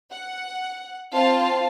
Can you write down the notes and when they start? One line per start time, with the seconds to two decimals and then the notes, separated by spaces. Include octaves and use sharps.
0.12 F#5
1.13 C4 F4 F5 A5